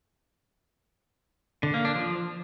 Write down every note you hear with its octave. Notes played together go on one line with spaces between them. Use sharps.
D3
A#3
D4
F3